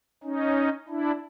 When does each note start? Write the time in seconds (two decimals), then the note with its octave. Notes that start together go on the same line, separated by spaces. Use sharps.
0.23 C#4 D#4
0.88 D4 E4